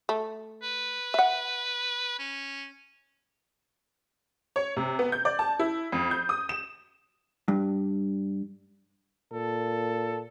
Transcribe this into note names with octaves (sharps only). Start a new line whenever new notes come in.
A3
B4
E5 F#5
C#4
C#5
C3
B3
G6
D5
A5
E4
F2
G6
D#6
E7
G2
A#2 A4